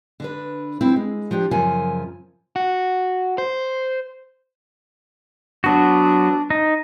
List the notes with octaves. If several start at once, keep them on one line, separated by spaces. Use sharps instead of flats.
D3 D4 B4
F#3 C4 E4
G#3
F3 D4 G4
F#2 C#3 F3 A#4 G#5
F#4
C5
F#3 B3 D4 F#4
D#4